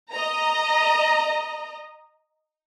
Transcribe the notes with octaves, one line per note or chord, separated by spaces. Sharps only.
D#5 A#5